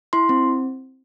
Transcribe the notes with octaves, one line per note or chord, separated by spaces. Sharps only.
E4 C6
C4